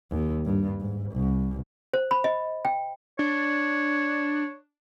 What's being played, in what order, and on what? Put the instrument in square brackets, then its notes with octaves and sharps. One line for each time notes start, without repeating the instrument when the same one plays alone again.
[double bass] D#2
G2
G#2
C2
[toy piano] C5
B5
D#5
G5
[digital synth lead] D4 [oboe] C#5